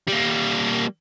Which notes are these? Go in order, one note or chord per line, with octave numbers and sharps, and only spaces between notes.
G3 A#3